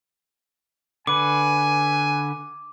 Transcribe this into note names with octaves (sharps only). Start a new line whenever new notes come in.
D3 B4 G#5 D6